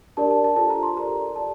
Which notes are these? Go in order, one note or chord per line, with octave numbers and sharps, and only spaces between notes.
D4 G4 A#4 D5 A5
A5
A5
F4 A4 C5 A5
A#5
C6
G4 A#4 D5 A#5
F4 A4 D5 A5